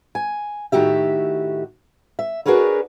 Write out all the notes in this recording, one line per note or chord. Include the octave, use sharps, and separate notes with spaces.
G#5
A2 D#3 F#4 G4 E5
E5
D4 F#4 G#4 A#4 B4 C#5